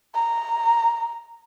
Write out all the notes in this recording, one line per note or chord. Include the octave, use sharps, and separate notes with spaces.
A#5